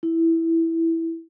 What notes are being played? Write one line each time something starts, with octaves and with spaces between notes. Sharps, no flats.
E4